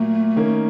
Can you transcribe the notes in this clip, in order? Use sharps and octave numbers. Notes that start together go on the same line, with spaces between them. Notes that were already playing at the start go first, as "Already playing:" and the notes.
Already playing: A#2 F#3 A3 A#3
D#3 A#3 C#4